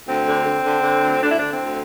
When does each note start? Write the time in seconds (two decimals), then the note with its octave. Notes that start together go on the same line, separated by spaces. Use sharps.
0.07 D2 C4
0.27 D3
0.45 D3
0.64 D3
0.83 D3
1.02 D2
1.21 D3 D4
1.29 E4
1.38 D3 D4
1.50 C4
1.59 D2